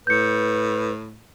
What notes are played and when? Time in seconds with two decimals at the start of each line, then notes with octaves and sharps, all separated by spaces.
0.07 A2 B4 G6 C#7